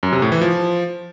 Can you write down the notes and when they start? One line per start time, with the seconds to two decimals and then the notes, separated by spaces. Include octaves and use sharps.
0.03 F#2
0.12 C3
0.22 A2
0.32 E3
0.41 F3